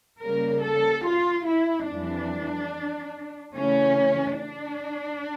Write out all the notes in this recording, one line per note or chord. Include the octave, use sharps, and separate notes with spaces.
C#3 G3 A#3 A#4
A4
F4
E4
F2 E3 G3 D4
C#3 E3 A3 C#4
D4